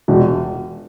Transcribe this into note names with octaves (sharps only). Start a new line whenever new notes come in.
E1